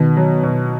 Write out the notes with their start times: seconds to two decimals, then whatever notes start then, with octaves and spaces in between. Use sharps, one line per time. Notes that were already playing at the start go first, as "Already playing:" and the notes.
Already playing: B2 D#3
0.17 F#3
0.43 B2